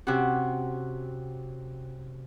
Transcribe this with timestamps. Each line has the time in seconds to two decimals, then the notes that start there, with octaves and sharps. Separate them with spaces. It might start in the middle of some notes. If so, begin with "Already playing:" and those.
0.07 C3 C#4 F#4